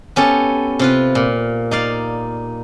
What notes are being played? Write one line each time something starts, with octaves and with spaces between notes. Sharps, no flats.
B3 C#4 G4 A4
C3 F4 B4
A#2
D#4 D5 F5